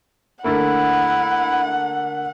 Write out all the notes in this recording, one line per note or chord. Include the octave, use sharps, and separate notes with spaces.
D3 A3 A#3 E4 F#5